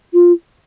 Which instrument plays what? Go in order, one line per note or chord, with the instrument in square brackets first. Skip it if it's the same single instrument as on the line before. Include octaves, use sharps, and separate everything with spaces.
[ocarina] F4